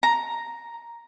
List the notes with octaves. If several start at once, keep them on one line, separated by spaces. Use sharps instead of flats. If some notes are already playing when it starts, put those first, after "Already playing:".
A#5